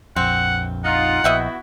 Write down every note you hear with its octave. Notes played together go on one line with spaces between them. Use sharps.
A#1 F2 C4 F#5
D#4 F4 F#5
A#1 B3 E4 F#4 D#5 E5 G5